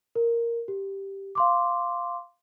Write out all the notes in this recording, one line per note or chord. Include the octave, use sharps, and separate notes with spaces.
A#4
G4
F5 C6 D6